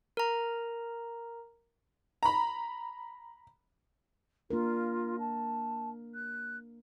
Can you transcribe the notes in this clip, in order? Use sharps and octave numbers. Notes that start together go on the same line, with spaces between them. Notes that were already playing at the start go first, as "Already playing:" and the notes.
A#4 A#5
A#5 B5
A#3 D4 F4 A#4
A5
F#6